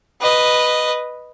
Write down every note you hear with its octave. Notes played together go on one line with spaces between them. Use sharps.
B4 D#5